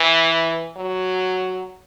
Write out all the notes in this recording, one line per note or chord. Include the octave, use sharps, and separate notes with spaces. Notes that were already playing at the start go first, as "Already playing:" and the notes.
Already playing: E3
F#3